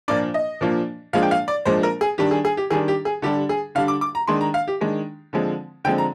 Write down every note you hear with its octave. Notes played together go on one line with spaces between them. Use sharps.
A#2 F3 A#3 D4 D5
D#5
A#2 F3 A#3 D4
A#2 F3 G#3 D4 F5
G5
F5
D5
A#2 F3 G#3 D4 C5
A#4
G#4
D#3 G3 D4 G4
G#4
G#4
G4
D#3 G3 D4 G#4
G4
G#4
D3 G3 D4 G4
G#4
D3 G3 D4 F5
D6
D6
A#5
D#3 G#3 D4 C6
A#5
F5
G4
D#3 G#3 D4
D3 F3 G#3 C4
D3 F3 G#3 C4 G5
A#5